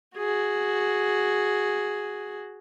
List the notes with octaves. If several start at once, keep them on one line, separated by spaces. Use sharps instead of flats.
F#4 G#4